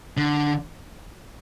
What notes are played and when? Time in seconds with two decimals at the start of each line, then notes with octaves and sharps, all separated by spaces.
0.17 D3